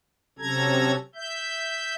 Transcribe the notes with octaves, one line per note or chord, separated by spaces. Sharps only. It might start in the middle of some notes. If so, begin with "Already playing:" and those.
C3 F#3 C#4 A4 A#5 G#6
E5 G6